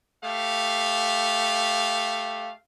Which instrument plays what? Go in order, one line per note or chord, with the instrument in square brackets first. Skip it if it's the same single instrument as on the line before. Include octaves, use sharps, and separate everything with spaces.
[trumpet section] A3 G4 F5